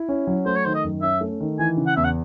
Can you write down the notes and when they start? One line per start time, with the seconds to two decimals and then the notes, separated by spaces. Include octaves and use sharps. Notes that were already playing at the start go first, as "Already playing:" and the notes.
Already playing: E4
0.09 C#4
0.27 F#3
0.46 A3 C5
0.56 C#5
0.65 D#3 C5
0.75 D#5
0.84 F#2
1.02 C#4 E5
1.21 A3
1.40 D#3
1.59 E3 G#5
1.77 C#3
1.87 F#5
1.96 E2 E5
2.05 F#5